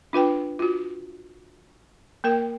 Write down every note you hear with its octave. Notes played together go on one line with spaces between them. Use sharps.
D4 F4 B4 G5
F4 F#4
A#3 A#4 G5